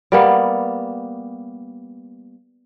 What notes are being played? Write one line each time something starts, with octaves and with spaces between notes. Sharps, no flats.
G3 A#3 B3